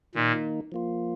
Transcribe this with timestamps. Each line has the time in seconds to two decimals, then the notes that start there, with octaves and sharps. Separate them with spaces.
0.15 A#2 D#3 A#3 D#4
0.72 F3 A#3 F4